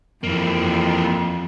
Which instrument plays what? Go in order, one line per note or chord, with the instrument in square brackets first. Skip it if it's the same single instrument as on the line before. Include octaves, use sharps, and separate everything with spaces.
[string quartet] F2 [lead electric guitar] E3 A#3